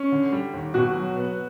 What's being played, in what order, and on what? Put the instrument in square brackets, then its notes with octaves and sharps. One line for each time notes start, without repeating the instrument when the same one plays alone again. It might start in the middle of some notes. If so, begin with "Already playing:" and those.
Already playing: [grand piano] C#4
D3
G3
D#2
[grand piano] B2 [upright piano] F#4
[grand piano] F#3
B3